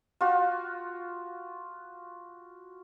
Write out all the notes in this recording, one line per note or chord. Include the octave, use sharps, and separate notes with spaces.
F4 F#4